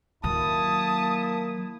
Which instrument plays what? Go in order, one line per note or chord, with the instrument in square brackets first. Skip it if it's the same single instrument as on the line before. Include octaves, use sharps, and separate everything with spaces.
[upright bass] D#3 F#3 [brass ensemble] A#3 E4 [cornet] A5 [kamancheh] D#6